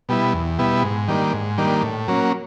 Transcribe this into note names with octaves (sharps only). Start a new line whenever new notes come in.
B2 G3 B3 E4
E2
B2 G3 B3 E4
G#2
D#3 G3 A#3 D4
G#2
D#3 G3 A#3 D4
A2
F#3 A#3 C#4